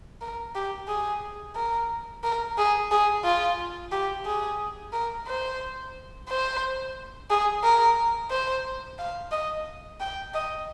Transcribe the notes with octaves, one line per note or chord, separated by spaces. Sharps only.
A#4
G4
G#4
A#4
A#4
G#4
G#4
F4
G4
G#4
A#4
C5
C5
G#4
A#4
C5
F5
D#5
G5
D#5